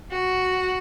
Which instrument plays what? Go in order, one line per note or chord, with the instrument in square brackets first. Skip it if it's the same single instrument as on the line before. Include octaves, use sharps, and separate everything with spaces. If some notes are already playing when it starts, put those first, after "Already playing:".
[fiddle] F#4